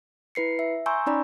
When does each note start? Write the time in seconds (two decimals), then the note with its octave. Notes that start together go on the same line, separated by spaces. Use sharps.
0.35 E4 B4 C7 C#7
0.59 E5
0.86 G#5 A#5 C6 C#6 E6 G6
1.06 C#4 D#4 D5 A#5 B5